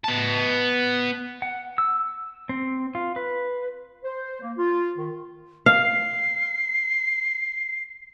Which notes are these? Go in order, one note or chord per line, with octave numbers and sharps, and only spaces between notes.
B3 A5
F#5
E6
C4
F4
B4
C5
A#3
F4
D#3
F5 C7